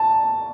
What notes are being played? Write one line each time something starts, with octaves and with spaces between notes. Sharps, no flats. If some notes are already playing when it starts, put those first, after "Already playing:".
Already playing: A5